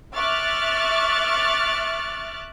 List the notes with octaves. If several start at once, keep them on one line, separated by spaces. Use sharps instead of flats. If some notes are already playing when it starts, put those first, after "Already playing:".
E5 C#6 D6 F6 F#6 A6